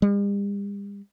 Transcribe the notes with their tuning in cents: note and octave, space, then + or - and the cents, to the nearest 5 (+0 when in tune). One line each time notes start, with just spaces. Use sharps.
G3 +45